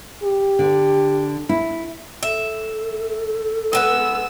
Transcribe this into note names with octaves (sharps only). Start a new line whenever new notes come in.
G4
D3
E4
A4 E5
G#3 B3 B4 E6